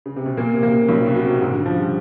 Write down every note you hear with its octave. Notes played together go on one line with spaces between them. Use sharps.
C#3
C3
B2
A#2 A#3
C3
A#3
C#3
B1 C3
C3
B2
F#3
C3
G#2 C#3
D3
C#3
F3
G3